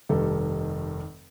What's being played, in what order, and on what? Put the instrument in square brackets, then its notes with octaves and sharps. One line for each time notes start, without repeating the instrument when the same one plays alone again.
[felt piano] F1 G2 D#3 G4 A4